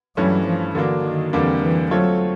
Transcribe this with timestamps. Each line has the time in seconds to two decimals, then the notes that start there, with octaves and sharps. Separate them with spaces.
0.17 G2 E3 F#3 A3 C#4
0.46 F3
0.75 D3 E3 F#3 A#3 D4
1.04 D#3
1.33 F2 D3 E3 G3 A#3 D4
1.62 E3
1.91 F#3 A3 C4 F4 A4 C#5